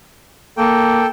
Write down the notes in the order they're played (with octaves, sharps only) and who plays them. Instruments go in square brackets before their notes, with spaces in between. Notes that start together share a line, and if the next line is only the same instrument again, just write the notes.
[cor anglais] A#3 [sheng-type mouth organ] A4 G5